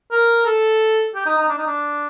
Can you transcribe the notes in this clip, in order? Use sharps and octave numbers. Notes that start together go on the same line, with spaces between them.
A#4
A4
G4
D#4
D#4
D4
D#4
D4